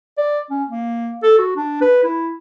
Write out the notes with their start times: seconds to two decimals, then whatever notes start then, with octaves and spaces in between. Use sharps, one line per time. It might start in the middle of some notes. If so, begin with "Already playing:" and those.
0.18 D5
0.50 C#4
0.69 A#3
1.23 A4
1.39 F#4
1.56 D4
1.81 B4
2.03 E4